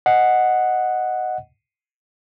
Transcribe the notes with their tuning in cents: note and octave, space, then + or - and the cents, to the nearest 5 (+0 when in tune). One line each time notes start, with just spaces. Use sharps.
D#5 +0 F#5 +0